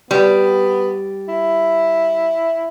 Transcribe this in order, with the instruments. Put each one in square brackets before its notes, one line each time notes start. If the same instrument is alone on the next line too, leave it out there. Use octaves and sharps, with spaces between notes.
[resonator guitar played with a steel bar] G3 [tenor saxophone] B3
[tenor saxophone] E4